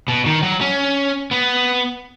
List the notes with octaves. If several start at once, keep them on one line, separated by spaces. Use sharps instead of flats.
B2
D#3
F#3
C#4
B3